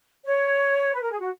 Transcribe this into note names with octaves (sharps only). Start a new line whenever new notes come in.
C#5
B4
A#4
G#4
F#4